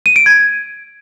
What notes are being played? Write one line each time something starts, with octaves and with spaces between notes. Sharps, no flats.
D#7
D7
G#6